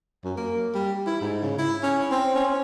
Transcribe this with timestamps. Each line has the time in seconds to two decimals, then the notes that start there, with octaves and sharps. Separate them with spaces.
0.24 F#2
0.37 A#3
0.75 G3
1.07 E4
1.21 G#2
1.42 C#3
1.59 E4
1.83 C#4
2.11 C4
2.35 C#4